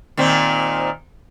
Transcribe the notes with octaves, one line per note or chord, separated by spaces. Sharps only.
A#2 D#3 C4